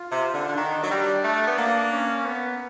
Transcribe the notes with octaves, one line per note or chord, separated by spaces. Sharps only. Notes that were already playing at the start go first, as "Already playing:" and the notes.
Already playing: F4
C3
D3
D3
D#3 D4
F#3
G3
A3
B3
A#3
C#4
B3